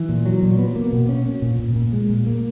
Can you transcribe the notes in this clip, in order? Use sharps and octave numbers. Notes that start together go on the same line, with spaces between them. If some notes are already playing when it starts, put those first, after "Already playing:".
Already playing: E3
A#2
F#3
A#2
B3
A#3
B2
C#4
C#4
A#2
A#2
A#2
G#3
A#2
A#3